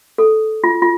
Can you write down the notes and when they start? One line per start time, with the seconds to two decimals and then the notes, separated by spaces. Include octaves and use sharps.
0.18 A4
0.64 F4
0.82 F4